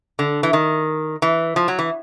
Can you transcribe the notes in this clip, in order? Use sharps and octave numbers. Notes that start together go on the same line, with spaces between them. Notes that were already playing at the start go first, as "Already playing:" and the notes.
D3
E3
D#3
E3
F3
F#3
E3